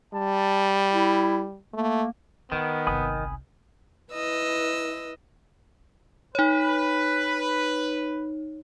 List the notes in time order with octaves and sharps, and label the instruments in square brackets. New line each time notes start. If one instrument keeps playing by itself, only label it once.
[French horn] G3 [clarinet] A5
[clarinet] E4
[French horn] A3 [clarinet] A#3
[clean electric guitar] D#3 [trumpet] B3 [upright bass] D#4
[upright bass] G1 C2 [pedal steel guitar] G#5 B5 D#6
[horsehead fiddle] E4 B4 [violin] D#5 E6
[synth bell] D#4 C#5 [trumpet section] B4